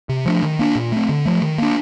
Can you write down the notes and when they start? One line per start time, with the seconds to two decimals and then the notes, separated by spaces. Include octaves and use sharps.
0.09 C3
0.26 F3 A3 D4
0.43 D#3
0.59 A#3 D4
0.75 A#2
0.92 A3 C4
1.09 D3
1.25 F3 A3
1.42 D#3
1.58 A#3 D4